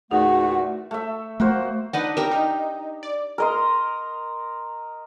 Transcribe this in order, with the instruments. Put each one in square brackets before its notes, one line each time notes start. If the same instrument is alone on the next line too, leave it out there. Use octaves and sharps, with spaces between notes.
[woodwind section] E2 A#2 A3 [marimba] D#4 [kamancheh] F#4 [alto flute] F#5
[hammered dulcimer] A3 E5
[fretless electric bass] A3 [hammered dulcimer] A#3 F#4 C5
[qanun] D4 D#4 B4 [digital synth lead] F#5
[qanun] G4 E5 [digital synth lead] A#4
[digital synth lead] D#4
D5
[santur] A#4 D#5 C6